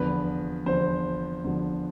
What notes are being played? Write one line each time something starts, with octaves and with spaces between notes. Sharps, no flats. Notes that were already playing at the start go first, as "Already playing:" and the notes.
Already playing: E2 D3 F3 B4
E2 D3 F3 C5
E2 D3 F3